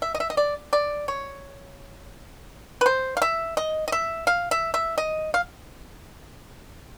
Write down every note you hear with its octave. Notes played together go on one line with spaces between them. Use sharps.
E5
D#5
E5
D#5
D5
D5
C#5
B4
C5
F5
E5
D#5
D#5
E5
F5
E5
E5
D#5
F5